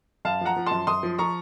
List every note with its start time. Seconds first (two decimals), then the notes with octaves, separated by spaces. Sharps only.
0.25 F#2 F5 A5
0.41 F3 F#5 A#5
0.56 F3
0.66 F#2 A5 C6
0.87 F#2 C6 D#6
1.03 F3
1.18 F3 A#5 C#6